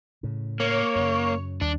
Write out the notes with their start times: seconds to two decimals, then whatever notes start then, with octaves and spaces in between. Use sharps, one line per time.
0.23 A2 C#3
0.60 A#3 C#5
0.96 F#2 C#3
1.61 D#2 G3 D4